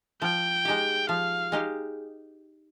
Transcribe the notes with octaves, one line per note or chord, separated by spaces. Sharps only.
F3 G5
G#3 D#4 G4
F3 F5
G#3 D#4 G4